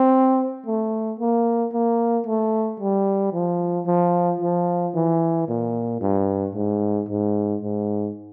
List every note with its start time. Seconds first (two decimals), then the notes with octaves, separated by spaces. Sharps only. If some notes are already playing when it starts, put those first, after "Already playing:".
Already playing: C4
0.66 A3
1.19 A#3
1.73 A#3
2.27 A3
2.80 G3
3.33 F3
3.87 F3
4.41 F3
4.95 E3
5.48 A#2
6.01 G2
6.55 G#2
7.08 G#2
7.62 G#2